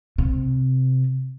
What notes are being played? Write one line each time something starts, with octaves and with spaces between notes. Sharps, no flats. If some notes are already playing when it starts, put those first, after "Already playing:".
C3